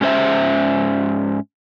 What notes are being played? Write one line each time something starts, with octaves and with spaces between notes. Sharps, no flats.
G#2 C#4 C5 E5